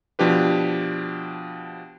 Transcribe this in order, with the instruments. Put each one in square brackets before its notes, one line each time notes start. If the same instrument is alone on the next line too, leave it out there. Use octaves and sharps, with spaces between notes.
[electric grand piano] B2 F3 D4 G4 B4